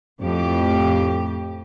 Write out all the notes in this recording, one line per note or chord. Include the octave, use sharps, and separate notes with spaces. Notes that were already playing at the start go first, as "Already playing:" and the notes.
F2 A2 G4